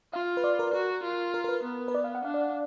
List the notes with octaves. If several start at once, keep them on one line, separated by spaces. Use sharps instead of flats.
F4 F5
B4
D5
A#4
F#4 A#4
F4
A#4
A#4
B4
B3
B4
D5
F5
F#5
D4 F5
D5